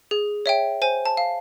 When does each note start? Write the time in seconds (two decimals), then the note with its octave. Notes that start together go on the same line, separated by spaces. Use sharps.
0.11 G#4
0.46 C#5 E5 G5
0.82 C5 G#5
1.06 A5
1.17 F5